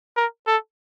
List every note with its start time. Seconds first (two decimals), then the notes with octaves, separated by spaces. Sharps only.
0.17 A#4
0.47 A4